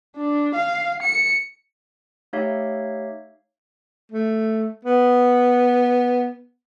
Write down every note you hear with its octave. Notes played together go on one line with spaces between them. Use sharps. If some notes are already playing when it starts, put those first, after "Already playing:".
D4
F5
C#7
A3 D#4 G4 C#5 E5 F5
A3
B3